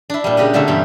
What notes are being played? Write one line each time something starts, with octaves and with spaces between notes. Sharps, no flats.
D4 E4
A#2 G3
C#3 G4 D#5 F#5
B2 D3 A3 A#3 E4 A4
G2 E3 B3 G4